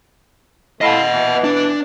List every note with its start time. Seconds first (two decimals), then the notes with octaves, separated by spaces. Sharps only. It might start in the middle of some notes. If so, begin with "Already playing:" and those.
0.81 A3 E4 F4 D#5 F#5
1.12 B2 E3
1.44 D4